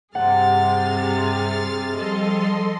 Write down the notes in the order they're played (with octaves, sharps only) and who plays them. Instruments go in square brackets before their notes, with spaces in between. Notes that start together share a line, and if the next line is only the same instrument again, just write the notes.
[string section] G2 C3 [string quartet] G#4 F6 A6 [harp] F#5
[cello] F3 G3 [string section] A4 D#5 C6